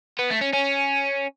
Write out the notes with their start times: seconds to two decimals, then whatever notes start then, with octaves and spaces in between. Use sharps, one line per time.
0.19 B3
0.30 A3
0.41 C#4
0.53 C#4